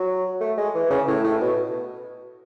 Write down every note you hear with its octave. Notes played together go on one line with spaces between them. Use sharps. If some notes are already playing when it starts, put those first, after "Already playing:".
Already playing: F#3
A3
G#3
E3
C#3
A2
A2
B2